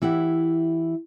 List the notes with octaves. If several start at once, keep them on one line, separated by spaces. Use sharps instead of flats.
E3 E4 G4 F#5